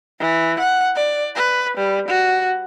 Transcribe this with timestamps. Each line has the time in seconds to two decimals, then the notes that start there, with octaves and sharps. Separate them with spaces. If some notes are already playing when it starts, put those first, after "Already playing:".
0.20 E3
0.59 F#5
0.96 D5
1.36 B4
1.77 G3
2.08 F#4